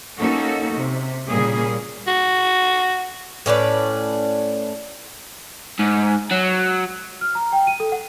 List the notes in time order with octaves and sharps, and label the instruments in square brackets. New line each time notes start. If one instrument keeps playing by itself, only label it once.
[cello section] A#3 C#4 D#4 F#4 A4
C3
A#2 C#3 G3 A#3 G#4
[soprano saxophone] F#4
[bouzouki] A2 C#4 B4 D5
[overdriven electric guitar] G#2
F#3
[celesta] F6
A#5
G5
D#7
A4
F#5